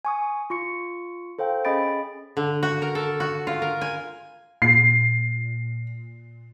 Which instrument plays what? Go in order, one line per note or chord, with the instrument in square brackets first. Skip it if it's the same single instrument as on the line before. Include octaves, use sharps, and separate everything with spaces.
[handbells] G#5 C#6 D#6
F4 C#6 C#7
A4 C5 F5 G5
C#4 G#4 D#5 B5 A6 D7
[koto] D3
F#4
A#4
A4
F#4
F4
A#4
G#5
[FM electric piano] A#2 [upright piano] C7